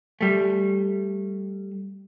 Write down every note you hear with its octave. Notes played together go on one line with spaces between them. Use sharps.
G3 A3